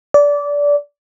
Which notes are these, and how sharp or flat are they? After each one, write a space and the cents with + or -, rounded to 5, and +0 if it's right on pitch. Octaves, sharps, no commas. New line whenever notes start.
D5 -20